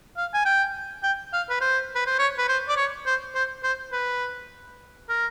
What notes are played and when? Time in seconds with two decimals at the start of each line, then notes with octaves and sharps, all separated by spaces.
0.17 F5
0.34 G#5
0.46 G5
1.03 G5
1.33 F5
1.50 B4
1.61 C5
1.95 B4
2.06 C5
2.19 C#5
2.38 B4
2.49 C5
2.68 D5
2.76 C#5
3.06 C5
3.35 C5
3.63 C5
3.92 B4
5.09 A#4